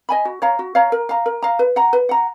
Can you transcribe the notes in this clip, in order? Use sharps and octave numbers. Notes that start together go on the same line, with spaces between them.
D#5 G#5 B5
F#4
C#5 F5 A#5
F#4
C#5 F5 A#5
A#4
F5 A#5
A#4
F5 A#5
B4
F#5 A#5
B4
F#5 A#5